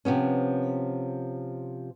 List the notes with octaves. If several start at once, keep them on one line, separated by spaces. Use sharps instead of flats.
C3 F3 B3 C#4